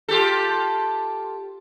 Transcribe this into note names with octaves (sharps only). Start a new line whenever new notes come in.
F4 G4 A4